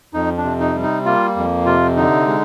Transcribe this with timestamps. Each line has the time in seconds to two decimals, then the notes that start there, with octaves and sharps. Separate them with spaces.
0.14 F2 D#4
0.37 D4
0.44 C3
0.60 D#4
0.75 G3
0.83 D#4
1.05 A#3 F4
1.36 F2
1.66 C3 F4
1.97 D3 D#4
2.27 G#3